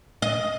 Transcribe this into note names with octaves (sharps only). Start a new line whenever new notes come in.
D#5